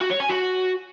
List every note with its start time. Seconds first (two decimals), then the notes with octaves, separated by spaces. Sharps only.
0.02 F#4
0.11 C#5
0.20 G#5
0.29 F#4